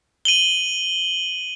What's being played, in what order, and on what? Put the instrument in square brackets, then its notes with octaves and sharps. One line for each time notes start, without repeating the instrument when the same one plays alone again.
[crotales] D#7 F#7 G7